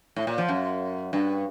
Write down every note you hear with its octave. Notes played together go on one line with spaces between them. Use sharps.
A2
A#2
F3
F#2
G2